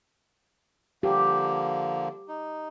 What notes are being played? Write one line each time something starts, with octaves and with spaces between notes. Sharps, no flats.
D3 F3 A#3 G4
D#4